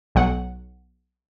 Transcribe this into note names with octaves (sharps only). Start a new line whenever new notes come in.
B1 F#3 F#5